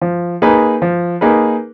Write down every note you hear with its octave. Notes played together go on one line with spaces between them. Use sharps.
F3
A#3 D#4 G#4 B4
F3
A#3 D#4 G#4 B4